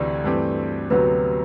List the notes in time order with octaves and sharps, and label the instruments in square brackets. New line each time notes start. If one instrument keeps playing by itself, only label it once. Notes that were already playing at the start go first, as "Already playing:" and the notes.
Already playing: [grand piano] D2 C3 E3 [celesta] D5
[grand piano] G2 E3 A3 C4 G4
[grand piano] D2 C3 F#3 B3 [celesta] B4